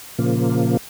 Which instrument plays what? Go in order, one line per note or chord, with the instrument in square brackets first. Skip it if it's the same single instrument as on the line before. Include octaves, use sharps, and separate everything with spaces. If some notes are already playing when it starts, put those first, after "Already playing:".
[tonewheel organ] A#2 C#3 F3 A#3